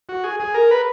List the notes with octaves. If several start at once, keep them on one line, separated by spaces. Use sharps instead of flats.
F#4
G#4
G#4
A#4
B4